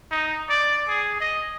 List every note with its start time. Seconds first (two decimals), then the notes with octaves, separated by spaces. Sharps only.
0.10 D#4
0.49 D5
0.88 G#4
1.20 D#5